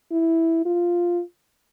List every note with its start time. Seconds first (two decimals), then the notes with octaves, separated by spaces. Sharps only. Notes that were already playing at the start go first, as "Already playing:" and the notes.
0.12 E4
0.65 F4